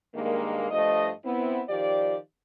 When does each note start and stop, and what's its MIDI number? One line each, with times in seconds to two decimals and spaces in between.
0.14 0.67 43
0.14 0.67 51
0.14 0.67 56
0.14 0.67 58
0.71 1.09 43
0.71 1.09 53
0.71 1.09 57
0.71 1.09 75
1.25 1.61 59
1.25 1.61 60
1.25 1.61 64
1.68 2.14 51
1.68 2.14 53
1.68 2.14 67
1.68 2.14 74